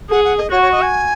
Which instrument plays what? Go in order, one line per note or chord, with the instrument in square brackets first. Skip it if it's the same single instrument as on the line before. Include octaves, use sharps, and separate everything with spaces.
[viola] G#4 [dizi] F#5
[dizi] F#5
D#5
[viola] F#4 [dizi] C#5
[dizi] C#5
D#5
G#5